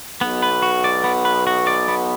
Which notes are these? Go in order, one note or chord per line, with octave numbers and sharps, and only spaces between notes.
B1 B2 B3
B4
F#4
D5
B3
B4
F#4
D5
B3